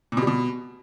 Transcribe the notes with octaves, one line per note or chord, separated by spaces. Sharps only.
A#2
B2
G3
B2